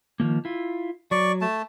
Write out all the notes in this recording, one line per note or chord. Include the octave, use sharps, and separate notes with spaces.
D#3 F3 A#3
E4 F4
F#3 D5 C#6
A3 A5